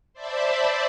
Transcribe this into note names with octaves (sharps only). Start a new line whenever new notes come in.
C5 D5 E5 A5 B5